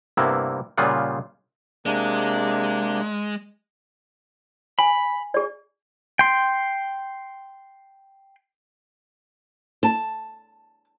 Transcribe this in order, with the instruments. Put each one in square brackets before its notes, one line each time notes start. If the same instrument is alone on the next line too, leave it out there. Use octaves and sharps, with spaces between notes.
[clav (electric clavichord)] G2 C3 A#3 B3 E4
A#2 C#3 G3 F4 G#4 F#5
[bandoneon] C3 A#3 D4 [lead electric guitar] G#3
[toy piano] G#5 [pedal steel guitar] B5
[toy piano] G#4 D5
[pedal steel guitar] G5 C6
[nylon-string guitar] A5